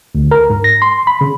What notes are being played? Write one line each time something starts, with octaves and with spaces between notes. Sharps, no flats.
D2
A#4
G#2
A#6
C6
B5
C#3